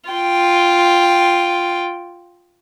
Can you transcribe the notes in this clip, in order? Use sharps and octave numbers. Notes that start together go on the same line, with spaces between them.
F4 G5